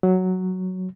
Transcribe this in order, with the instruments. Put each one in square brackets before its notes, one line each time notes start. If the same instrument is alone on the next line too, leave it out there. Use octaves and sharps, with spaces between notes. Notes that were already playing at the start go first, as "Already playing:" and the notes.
[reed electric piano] F#3